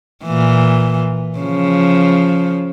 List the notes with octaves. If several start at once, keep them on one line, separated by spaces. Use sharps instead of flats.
A#2 E3
C#3 F3